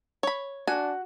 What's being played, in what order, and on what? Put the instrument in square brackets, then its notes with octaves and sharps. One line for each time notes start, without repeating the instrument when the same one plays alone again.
[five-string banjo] C#5 B5
[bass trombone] D4 [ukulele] F#4 [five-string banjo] G#5